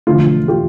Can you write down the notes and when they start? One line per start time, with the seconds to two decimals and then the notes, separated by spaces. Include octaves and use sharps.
0.07 E1 D2 D3 F3 A3 F4
0.48 F4 G4